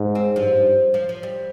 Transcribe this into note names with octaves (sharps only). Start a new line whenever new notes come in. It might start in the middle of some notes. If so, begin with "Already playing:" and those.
Already playing: G#2
C4
G2 F3
F3
F3
G3